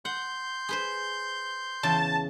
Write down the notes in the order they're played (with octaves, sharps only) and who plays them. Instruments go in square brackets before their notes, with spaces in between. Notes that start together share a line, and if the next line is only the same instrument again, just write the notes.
[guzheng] F#5 [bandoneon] C6 G6
[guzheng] G#4 B4 C5
[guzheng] E2 C#3 [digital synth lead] A5